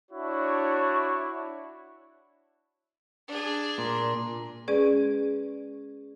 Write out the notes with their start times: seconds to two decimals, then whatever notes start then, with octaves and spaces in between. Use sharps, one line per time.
0.12 D4 E4 F#4 C#5
3.28 D4 G#4
3.78 A#2
4.68 G#3 C#4 G#4 B4 D5